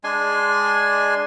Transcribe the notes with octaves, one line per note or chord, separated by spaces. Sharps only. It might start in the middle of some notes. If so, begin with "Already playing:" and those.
G#3 D4 G#5 C6